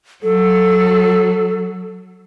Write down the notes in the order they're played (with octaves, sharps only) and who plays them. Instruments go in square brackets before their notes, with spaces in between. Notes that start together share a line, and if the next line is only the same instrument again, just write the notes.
[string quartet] F#3 [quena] A4